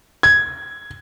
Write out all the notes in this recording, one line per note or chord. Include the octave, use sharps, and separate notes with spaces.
G#6